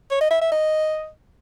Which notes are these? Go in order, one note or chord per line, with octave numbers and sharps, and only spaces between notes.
C#5
D#5
E5
E5
D#5